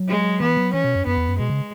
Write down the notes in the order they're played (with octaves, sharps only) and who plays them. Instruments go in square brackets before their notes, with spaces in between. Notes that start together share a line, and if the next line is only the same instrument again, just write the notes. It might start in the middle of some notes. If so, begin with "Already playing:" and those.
Already playing: [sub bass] F#3
[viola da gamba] G#3
[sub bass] E3 [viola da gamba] B3
[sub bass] F#3
[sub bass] E3 [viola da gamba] C#4
[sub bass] B2
F#2
[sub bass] F#2 [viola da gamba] B3
[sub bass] E2
F#2
[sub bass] B2 [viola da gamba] G#3
[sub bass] C#3